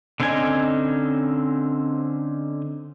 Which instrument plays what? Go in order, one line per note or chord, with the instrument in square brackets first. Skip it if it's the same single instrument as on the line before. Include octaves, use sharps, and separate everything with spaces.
[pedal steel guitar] D3 C4 C#4 D#4 G#5